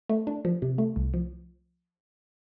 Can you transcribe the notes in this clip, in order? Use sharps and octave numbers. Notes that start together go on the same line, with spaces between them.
A3
D4
F3
C3
A3
C2
F3